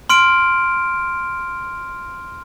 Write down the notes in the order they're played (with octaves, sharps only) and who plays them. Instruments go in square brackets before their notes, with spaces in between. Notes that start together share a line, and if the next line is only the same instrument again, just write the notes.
[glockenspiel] C6 F6 D7